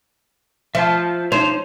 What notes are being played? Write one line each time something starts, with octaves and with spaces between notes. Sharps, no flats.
F3 E5 A5
D#4 C5 C#5